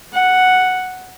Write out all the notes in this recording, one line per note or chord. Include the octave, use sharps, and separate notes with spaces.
F#5